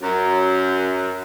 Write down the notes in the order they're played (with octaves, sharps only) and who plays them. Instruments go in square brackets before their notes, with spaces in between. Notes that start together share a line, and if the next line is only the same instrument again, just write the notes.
[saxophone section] F#2